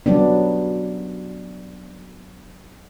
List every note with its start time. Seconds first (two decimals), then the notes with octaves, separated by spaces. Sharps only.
0.06 F#3 G3 B3 D4